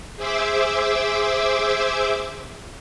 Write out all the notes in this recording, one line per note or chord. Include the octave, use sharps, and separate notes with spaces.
G#4 C5 E5 D6 E6